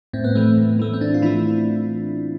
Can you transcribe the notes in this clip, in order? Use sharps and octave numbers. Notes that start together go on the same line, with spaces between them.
A2 C4
B3
E3 A3 C4
A2
E3 A3
C4
A2 D4
F4
E3 A3 E4